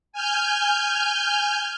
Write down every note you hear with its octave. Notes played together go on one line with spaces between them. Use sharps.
G#5 F6 G6